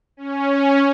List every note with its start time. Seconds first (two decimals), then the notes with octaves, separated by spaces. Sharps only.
0.17 C#4